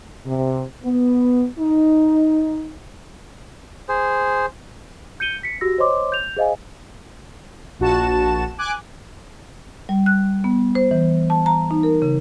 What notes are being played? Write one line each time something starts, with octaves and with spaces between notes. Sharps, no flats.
C3
B3
D#4
G#4 C5
G6 C#7 D#7 G7
B6 C#7
F#4 G4 E6 A#6
C5 C#5 D#5 C6 D6
G6 F7
G#4 C5 D#5 F5 G#5
A#1 F#4 A5 E7
G#5 D6 F#6
G3
F#6
B3
C5
E3
A5
A#5
D#4
A#4
C#3